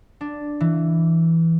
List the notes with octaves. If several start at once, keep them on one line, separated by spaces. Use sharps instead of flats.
D4
E3